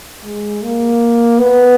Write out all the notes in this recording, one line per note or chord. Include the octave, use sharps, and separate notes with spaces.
G#3
A#3
B3